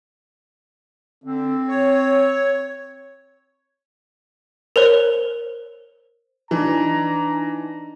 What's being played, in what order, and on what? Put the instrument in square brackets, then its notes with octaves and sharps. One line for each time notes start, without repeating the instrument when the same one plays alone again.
[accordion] D3 [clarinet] C4
[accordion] C#5
[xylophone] A#4 C5 C#5
[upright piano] E3 [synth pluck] D4 D#4 A5 [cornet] A#5